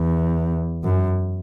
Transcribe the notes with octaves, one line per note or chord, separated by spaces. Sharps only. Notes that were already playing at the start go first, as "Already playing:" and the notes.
Already playing: E2
F#2